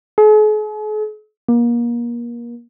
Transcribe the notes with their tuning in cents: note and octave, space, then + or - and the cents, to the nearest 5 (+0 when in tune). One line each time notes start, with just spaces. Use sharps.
G#4 +45
A#3 +30